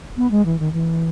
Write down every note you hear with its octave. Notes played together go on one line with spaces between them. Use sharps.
B3
G#3
E3
D#3
E3